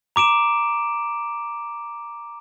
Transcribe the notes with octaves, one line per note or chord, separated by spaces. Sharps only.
A#5 D6 D7 E7